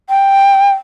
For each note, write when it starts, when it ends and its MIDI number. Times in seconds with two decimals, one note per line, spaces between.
0.09 0.72 79